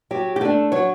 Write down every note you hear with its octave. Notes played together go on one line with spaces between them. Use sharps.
F#3 G4
G4
A3 D4 A4
F#3 C#5